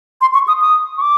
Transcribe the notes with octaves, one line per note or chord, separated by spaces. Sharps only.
C6
C#6
D#6
D#6
C#6
D6